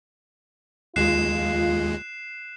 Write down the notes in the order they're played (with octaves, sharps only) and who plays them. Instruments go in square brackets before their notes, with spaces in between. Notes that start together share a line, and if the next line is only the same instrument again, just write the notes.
[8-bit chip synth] D#2 G#3 [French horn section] F4 [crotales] F#6 C7 E7